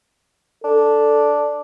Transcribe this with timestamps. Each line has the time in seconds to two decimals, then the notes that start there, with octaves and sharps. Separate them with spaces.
0.64 D4 A4